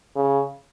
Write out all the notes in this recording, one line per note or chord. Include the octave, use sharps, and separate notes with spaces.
C#3